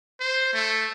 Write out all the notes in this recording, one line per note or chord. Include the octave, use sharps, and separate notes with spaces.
C5
A3